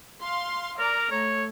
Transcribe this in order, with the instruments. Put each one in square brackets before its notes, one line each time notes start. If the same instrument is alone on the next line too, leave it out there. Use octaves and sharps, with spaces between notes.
[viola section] F5 C6
[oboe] A#4 [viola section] D5 A#5
[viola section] A3 [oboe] C#5